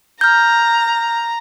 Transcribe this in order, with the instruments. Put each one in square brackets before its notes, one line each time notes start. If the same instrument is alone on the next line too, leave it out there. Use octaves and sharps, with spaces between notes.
[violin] A#5 [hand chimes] F6 G6